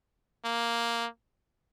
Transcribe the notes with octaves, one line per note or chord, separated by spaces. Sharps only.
A#3